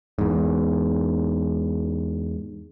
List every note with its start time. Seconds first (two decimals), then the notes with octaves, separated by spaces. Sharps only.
0.19 E2 G#2